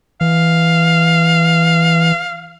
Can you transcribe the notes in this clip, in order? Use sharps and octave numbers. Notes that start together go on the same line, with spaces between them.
E3 F5